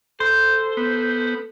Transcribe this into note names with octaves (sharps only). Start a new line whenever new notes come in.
A4 C5
B3